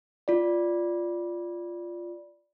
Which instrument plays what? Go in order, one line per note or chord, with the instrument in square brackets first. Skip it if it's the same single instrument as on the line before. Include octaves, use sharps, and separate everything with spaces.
[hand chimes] F4 D5